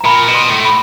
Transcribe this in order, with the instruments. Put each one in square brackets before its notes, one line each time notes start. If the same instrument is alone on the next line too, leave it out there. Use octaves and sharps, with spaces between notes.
[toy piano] A#5
[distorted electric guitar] A#2 [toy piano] B5
[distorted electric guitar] B2
[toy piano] C6
[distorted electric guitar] A2
[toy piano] B5